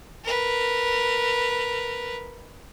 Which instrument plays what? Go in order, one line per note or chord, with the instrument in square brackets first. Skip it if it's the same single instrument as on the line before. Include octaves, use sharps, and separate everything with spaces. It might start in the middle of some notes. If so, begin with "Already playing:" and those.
[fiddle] A#4 B4